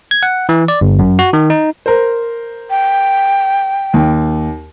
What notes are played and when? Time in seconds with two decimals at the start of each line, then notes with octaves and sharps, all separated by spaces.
0.11 G#6
0.23 F#5
0.49 E3
0.68 D5
0.81 G1
0.99 F#2
1.19 F#4
1.33 D#3
1.50 D#4
1.86 A#4 C5
2.70 G5
3.94 D#2